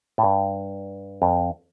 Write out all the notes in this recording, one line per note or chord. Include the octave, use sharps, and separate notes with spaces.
A2
G2
F2